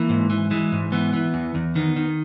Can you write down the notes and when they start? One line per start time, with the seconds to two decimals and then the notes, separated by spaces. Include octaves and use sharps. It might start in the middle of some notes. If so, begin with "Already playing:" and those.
Already playing: E3 A#3
0.09 G#2
0.30 E3
0.51 E3 G#3
0.72 G#2
0.92 E3 B3
1.13 E3
1.34 E2
1.55 E2
1.75 D#3 B3
1.96 D#3